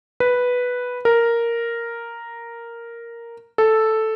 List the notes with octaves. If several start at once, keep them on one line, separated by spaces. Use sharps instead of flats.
B4
A#4
A4